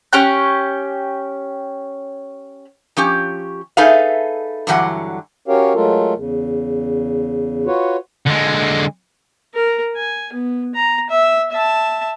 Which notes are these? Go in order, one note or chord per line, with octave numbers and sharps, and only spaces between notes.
C#4 G4 G5 F#6
F3 C#4 G4
D#4 G#4 A4 B4 E5 F5
G2 D3 E3 F#3 F#5
C#4 F#4 G4 A#4 C#5 F5
F#3 G#3 A3 F4 A4 A#4
E2 C#3
F4 F#4 B4 C#5
D3 G#3
A#4
G#5
B3
A#5
E5
E5 A5